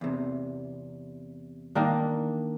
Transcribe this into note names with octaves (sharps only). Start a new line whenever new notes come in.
E2 C3
D#3 A#3 D4